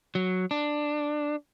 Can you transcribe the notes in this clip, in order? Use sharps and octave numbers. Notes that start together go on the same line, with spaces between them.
F#3
D4